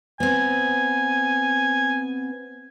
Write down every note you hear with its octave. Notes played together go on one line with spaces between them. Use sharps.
B3 C4 G#5